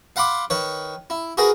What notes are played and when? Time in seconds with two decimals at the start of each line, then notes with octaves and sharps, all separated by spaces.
0.16 F5 F#5 B5 C6 D6
0.50 D#3 B4 C#5
1.10 E4
1.37 F#4 G#4 A#4 B4